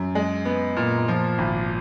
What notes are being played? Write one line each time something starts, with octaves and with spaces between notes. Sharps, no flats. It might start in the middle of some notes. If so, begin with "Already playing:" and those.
Already playing: F#2
G#3
B3
A#2
F3
G#1